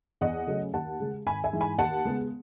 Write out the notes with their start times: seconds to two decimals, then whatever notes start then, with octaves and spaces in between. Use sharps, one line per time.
0.21 E2 D#5 F#5
0.47 C#3 F#3 A3 C#4
0.74 D#2 F#5 A5
1.00 C#3 G#3
1.26 G#1 G#5 B5
1.44 E5 G#5
1.53 G#2 E3
1.61 G#5 B5
1.78 D#2 F#5 A5
2.05 C#3 G#3 B3